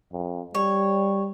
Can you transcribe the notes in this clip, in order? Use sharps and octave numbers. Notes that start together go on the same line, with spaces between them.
F2
G3 C#5